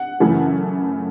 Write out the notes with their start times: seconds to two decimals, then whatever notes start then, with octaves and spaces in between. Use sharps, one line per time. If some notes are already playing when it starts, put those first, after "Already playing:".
Already playing: F#5
0.20 F#2 C#3 E3 A3